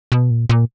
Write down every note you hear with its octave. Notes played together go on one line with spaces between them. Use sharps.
B2
A#2
A#2